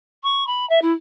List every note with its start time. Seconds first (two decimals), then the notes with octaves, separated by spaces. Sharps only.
0.23 C#6
0.47 B5
0.69 E5
0.81 E4